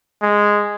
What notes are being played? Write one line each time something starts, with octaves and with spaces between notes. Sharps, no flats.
G#3